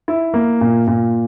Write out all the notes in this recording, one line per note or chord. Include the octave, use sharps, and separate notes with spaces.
E4
A#3
A#2
A#2